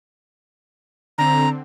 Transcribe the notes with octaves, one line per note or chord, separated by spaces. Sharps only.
D3 C4 A#5